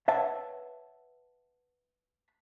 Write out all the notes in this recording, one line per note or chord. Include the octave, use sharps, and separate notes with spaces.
B4 C#5 E5 F#5 A5